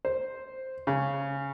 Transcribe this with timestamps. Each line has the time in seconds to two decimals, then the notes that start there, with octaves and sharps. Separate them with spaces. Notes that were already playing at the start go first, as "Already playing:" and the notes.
0.05 C5
0.87 C#3